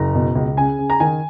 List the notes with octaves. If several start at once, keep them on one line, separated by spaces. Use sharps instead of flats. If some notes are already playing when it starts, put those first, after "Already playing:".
Already playing: F#1 A#5
B2
C#2
C#3 G#5
C#3
A#5
D#3 G#5